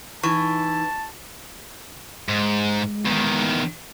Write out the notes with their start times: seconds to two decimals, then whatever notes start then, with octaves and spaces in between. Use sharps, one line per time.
0.23 E3 D#4 A5 C#6
2.29 G#2 G#3
3.06 E2 D#3